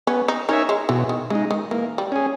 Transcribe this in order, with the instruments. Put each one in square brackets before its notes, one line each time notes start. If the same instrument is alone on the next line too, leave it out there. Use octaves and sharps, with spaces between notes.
[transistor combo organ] B3 [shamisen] C#4
[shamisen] D#4
[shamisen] C#4 [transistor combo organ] D#4 A#4 C#5 E5
[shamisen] G#3
[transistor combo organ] B2 [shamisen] E3
[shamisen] D#3
[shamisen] C#3 [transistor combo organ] G#3 D#4
[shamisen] D#3
[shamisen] E3 [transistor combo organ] A#3
[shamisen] G3
[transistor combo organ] C#4 G#4